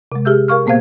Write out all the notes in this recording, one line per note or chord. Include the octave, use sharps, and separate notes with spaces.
C3 G#3
G4 G#4 E5 E6 G6
A#4 F5 C#6 F6
A#2 A#3 B3 C5 F5 G#6